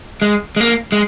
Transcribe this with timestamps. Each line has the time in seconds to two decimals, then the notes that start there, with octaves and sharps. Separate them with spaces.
0.22 G#3
0.56 G#3
0.61 A#3
0.92 G#3